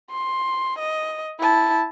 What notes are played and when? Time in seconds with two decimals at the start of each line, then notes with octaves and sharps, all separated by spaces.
0.11 C6
0.79 D#5
1.40 E4 A5